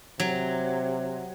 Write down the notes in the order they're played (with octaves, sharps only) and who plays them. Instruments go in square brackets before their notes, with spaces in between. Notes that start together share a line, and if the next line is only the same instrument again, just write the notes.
[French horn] C3 [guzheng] F#3